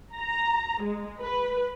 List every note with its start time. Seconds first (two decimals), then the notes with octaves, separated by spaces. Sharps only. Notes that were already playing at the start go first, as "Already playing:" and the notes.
0.15 A#5
0.83 G#3
1.20 B4